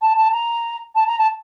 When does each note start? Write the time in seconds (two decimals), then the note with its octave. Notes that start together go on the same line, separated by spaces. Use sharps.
0.02 A5
0.17 A5
0.32 A#5
0.95 A5
1.07 A#5
1.19 A5